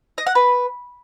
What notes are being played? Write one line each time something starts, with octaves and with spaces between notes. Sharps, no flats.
D#5
F#5
B4